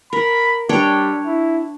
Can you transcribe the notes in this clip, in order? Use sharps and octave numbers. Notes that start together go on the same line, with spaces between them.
A#4 B5
G3 D4 C#5 G5
E4